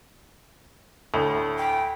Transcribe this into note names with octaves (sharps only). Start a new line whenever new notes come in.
D2 A2
G5